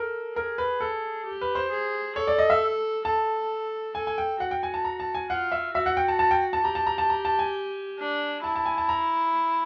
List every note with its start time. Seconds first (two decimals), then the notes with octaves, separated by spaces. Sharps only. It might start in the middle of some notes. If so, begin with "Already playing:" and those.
Already playing: A4 A#4
0.36 G#4 A#4
0.58 B4
0.80 A4
1.26 G4
1.41 B4
1.55 C5
1.71 G#4
2.16 A4 C#5
2.28 D5
2.38 D#5
2.50 E5
3.05 A4 A5
3.95 A4 G#5
4.07 G#5
4.18 G5
4.40 F#4 F#5
4.51 G5
4.63 G#5
4.74 A5
4.85 A#5
5.00 A5
5.15 G#5
5.30 F4 F#5
5.52 E5
5.74 F#4 E5
5.86 F#5
5.97 G5
6.08 A5
6.19 A5
6.31 G5
6.53 A5
6.64 G4 A#5
6.75 A5
6.87 A#5
6.98 A5
7.10 A#5
7.25 A5
7.39 G#5
7.99 D4
8.43 E4 A5
8.56 A5
8.66 G#5
8.78 A5
8.89 A#5